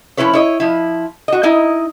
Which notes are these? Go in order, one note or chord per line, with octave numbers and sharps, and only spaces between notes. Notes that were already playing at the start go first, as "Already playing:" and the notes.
F3 B3 C#4 E4 B4 C#5
E4 C#5 D#5
F3 E4
F#4 D#5
D#4 E4 D#5